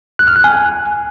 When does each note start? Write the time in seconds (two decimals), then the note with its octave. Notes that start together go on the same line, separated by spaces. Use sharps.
0.19 F#6
0.28 F6
0.36 F#6
0.44 G#5